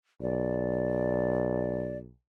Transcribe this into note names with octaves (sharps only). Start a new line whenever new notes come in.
B1 D5